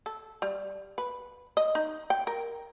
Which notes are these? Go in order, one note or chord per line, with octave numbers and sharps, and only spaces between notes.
A4
G3
B4
D#5
D#4
G5
A#4